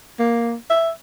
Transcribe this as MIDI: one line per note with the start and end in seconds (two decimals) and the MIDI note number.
0.19 0.55 58
0.70 0.90 76